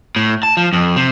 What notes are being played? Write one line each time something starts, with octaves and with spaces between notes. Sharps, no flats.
A2
A5
F3
F2
C3